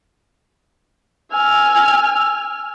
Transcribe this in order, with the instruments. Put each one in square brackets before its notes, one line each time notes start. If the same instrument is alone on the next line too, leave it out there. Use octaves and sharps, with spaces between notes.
[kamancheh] G#5 F6 [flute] E6